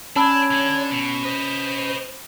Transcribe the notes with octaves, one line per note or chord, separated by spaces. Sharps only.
C#4 D4 C#5 A5 B5 E6
D3 D4
B2
B4 C5 D#5